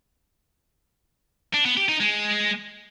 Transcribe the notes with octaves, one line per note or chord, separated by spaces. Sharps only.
D4
B3
G4
D#4
G#3